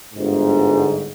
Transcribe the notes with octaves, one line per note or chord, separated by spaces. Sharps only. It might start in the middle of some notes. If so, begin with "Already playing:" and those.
G1 G#2